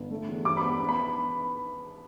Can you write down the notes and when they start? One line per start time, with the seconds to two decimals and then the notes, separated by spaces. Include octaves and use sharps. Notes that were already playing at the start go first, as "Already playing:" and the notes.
Already playing: G1
0.11 A3
0.28 E2
0.45 G2 D6
0.57 B5
0.62 B3
0.80 B3
0.89 B5